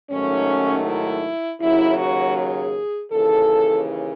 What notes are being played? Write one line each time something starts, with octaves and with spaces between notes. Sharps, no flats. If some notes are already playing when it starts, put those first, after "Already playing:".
G#2 D#3 F#3 A3 C#4
E4
D#2 C#3 F#3 E4
F#4
G#4
D#2 C#3 E3 A4